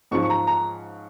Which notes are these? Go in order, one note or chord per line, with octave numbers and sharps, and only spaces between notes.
G#2 F3 C#4 C#6
C#6
A#5
A#5